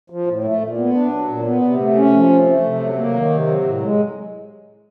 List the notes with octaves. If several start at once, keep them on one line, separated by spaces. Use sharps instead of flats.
F3
A2
A3
A#2
B3
D4
F#3
A#2
B3
C3
A3
C#4
F3
C3
A3
C3
F#3
A#3
D#3
C3
F#3
A2
G#3